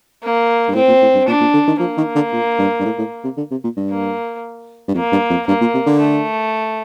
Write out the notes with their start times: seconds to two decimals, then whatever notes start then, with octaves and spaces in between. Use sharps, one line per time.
0.23 A#3
0.68 G2
0.75 A2 C4
0.88 A#2
1.02 A2
1.14 G2
1.27 A#2 D4
1.41 A#2
1.54 D3
1.67 D#3
1.80 F3 A#3
1.97 D#3
2.15 D3
2.32 A#2
2.58 G2
2.80 G2
2.85 A2
2.98 A2
3.24 C3
3.37 D3
3.51 C3
3.64 A#2
3.77 G2
3.90 A#3
4.88 G2
4.94 F2 A#3
5.12 G2
5.30 F2
5.47 G2 A#3
5.61 A#2
5.74 C3
5.86 D3
5.99 A3